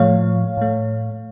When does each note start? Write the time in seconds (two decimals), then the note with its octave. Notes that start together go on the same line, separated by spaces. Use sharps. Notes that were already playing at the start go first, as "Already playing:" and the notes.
Already playing: A2 F3 A3 C#5 F5
0.57 A2 A3